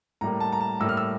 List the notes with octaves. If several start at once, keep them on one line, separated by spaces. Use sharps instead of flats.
A2 G3 A#3 A#5
A5
A#5
A5
A2 G3 A#3 E6
F6
E6